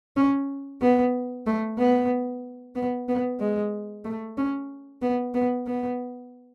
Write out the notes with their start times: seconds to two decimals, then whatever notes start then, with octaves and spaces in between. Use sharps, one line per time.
0.17 C#4
0.81 B3
1.46 A3
1.78 B3
2.76 B3
3.08 B3
3.40 G#3
4.05 A3
4.38 C#4
5.02 B3
5.34 B3
5.67 B3